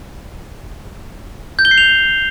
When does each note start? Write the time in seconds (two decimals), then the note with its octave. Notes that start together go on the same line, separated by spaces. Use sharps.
1.59 G6
1.65 G7
1.71 C7
1.78 F7